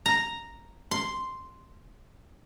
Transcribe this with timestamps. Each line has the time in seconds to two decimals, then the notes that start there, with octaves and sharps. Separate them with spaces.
0.06 A#5
0.91 C6